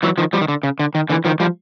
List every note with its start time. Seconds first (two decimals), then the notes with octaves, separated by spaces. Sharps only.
0.03 E3 F#3
0.18 D#3 F3
0.33 F3 G3
0.41 D#3
0.48 D3
0.63 C#3
0.79 D3
0.95 D#3
1.10 D3 E3
1.25 D#3 F3
1.40 F3 G3